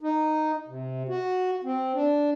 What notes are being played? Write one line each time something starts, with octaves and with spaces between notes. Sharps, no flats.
D#4
C3
F#4
C4
D4